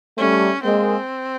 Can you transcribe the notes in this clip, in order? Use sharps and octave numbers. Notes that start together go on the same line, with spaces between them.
G3 A3 C#4
G#3 A#3 C4